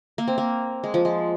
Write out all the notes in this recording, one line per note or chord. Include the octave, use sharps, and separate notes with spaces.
A#3
C4
A#3
G#3
F3
G#3